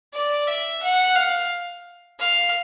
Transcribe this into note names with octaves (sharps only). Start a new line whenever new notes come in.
D5
E5
F#5
F5
F5